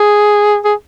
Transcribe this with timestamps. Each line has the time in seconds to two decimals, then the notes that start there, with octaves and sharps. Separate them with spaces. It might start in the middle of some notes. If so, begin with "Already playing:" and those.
Already playing: G#4
0.64 G#4